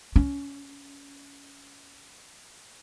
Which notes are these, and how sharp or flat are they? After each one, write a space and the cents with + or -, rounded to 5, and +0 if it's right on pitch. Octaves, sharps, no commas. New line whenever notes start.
C#4 +20